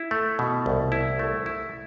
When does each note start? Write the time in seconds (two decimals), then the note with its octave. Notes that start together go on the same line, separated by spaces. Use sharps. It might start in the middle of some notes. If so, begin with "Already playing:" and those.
Already playing: E4
0.11 A3
0.39 B2
0.66 C2
0.92 E4
1.19 A3
1.46 E4